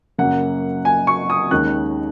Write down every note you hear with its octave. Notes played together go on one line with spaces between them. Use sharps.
F#2 C#3 F#3 A#3 C#4 F#5
G#5
C#6
D#6
D#2 D#3 G#3 C#4 F#6